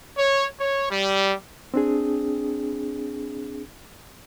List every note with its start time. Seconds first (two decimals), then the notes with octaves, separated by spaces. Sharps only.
0.18 C#5
0.59 C#5
0.90 G3
1.74 C4 D4 G#4